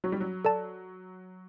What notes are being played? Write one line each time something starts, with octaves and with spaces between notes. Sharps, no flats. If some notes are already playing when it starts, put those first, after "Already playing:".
F#3 F#4
G3
F#3
A4 D5 A5